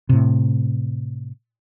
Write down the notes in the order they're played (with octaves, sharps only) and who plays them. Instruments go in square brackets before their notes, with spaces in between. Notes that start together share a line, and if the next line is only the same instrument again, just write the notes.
[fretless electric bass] A2 C3